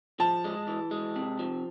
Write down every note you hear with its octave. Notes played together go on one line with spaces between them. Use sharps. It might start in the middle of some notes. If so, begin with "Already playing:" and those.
F3 A5
G#3
E3
G#3
C3
F3